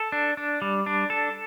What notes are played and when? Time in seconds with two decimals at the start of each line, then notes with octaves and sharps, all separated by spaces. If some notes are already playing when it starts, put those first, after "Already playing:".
Already playing: A4
0.12 D4
0.37 D4
0.62 G3
0.86 D4
1.10 A4